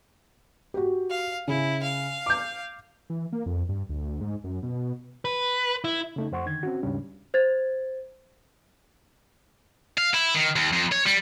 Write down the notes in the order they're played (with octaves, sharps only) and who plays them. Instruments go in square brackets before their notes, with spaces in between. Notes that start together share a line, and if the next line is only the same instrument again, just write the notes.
[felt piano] F#4 G4
[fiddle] F5
[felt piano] C#3 [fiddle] E4
[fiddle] F5
[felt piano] D6 G6
[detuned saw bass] E3
A#3
F2
G2
D2
G#2
F#2
B2
[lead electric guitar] B4
E4
[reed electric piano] C#3 A3 D#4
F2 C5 F#5 C6 C#6
D3 D#3 G#6
C4 C#4 F#4
D#2 G#2 C#3 G3 C#4 D4
[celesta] C5 G#6 A6
[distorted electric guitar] F5
E4
D#3
D#2
F2
C#5
G3